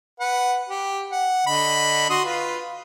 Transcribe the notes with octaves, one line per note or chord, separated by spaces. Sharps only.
B4 F#5
G4
F#5
D3 D#5 B5
F#4 C6 D#6
F4 B4